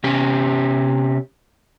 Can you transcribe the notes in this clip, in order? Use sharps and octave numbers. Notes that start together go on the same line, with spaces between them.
C3 C#4 G4